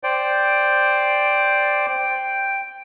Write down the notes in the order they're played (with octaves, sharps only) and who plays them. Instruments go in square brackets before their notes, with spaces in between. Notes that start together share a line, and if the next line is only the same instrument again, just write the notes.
[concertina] C5 D5 G5
G5